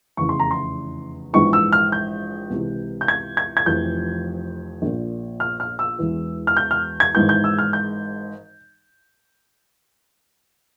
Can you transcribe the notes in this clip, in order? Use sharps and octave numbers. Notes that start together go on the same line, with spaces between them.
F1 E2 C#3 E3 C#6
C6
A#5
C6
A#1 G#2 E3 C#6
E6
F6
G6
C#2 C3 E3
G6
G#6
G#6
G#6
F1 F2 E3 G6
A#1 A#2
F6
F6
E6
E1 E2 E3
F6
G6
F6
G#6
G#1 G#2 E3 G6
G6
E6
F6
G6